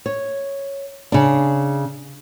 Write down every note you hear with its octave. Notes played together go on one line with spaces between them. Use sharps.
C#5
C#3 D4